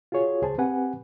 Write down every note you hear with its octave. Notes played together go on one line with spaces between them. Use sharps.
F4 F#4 G#4 C#5
C#2 G#4 C5 A5
C4 G4 B4 F#5 G#5